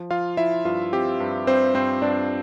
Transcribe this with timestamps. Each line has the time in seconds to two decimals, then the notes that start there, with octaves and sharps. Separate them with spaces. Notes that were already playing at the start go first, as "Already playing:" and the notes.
Already playing: F3
0.11 F3 F4 F5
0.37 F3 E4 E5
0.65 G2 F4
0.93 C4 G4
1.20 G2
1.47 G2 C4 C5
1.75 G2 C4 C5
2.02 G2 D4 D5